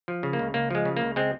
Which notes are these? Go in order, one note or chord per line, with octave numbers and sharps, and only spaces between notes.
F3
C#3
A#3
C#2
C#2 A#3
F3 G#3
C#3
C#2 A#3
G#3 C4